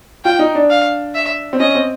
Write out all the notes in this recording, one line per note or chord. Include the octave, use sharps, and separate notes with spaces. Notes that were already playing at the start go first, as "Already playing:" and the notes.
F4 G5
D#4
D4
F5
E5
C4
C#4 D#5
C4